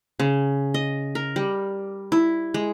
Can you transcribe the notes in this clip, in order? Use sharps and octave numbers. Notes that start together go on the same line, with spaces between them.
C#3
D#5
A#4
G3
E4
G#3